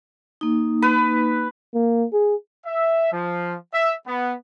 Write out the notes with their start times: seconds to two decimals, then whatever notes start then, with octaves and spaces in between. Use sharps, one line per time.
0.41 A#3 D#4
0.82 B4
1.74 A#3
2.13 G#4
2.65 E5
3.12 F3
3.73 E5
4.06 B3